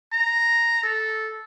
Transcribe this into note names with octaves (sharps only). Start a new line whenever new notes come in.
A#5
A4